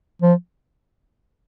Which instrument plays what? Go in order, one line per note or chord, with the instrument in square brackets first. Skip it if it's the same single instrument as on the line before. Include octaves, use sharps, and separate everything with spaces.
[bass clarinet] F3